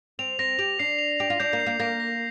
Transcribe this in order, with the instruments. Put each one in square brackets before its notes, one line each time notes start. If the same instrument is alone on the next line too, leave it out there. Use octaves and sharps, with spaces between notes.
[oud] C4 [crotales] F7
[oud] C4 [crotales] A#6
[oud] G4 [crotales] F7
[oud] D4 [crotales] C7
[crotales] F7
[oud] G4 [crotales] F7
[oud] F4
[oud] D4 [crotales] G6
[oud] A#3
[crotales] C7
[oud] A#3
[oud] A#3 [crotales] A#6
[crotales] A#6